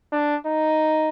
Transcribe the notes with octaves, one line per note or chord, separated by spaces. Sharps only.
D4
D#4